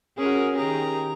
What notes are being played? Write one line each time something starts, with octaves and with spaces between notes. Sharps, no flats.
C#4 F#4 G#4 A#4
D#3 G4 G#4 A#5